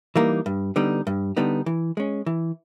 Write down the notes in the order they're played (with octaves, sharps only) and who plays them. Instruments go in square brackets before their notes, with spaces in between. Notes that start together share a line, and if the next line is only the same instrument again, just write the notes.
[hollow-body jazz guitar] E3 G3 A#3 D#4
G2
D3 G3 B3 D#4
G2
D3 G3 B3 D#4
E3
G#3 C#4
E3